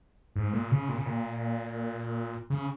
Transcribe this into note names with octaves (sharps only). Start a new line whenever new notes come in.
G#2
A#2
C#3
A#2
C#3
A#2
C#3